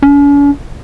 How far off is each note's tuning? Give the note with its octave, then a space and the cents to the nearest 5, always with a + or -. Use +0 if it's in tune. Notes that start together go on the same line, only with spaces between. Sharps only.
C#4 +45